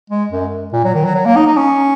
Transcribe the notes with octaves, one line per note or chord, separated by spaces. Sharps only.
G#3
F#2
A#2
F#3
D#3
F#3
F#3
A#3
D#4
D#4
C#4